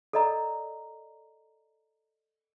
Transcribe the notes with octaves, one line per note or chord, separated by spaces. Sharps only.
A4 A#4 D5 D#5 A#5